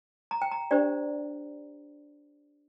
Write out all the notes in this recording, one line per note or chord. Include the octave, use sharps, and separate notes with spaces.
A#5
G5
A#5
D4 G4 C5 D5